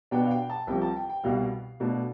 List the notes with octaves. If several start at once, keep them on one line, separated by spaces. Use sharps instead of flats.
B2 B3 D4 G5
F5
G5
A5
C2 C3 F3 G5
A5
G5
G5
C2 B2 G3 F5
B2 A3 D4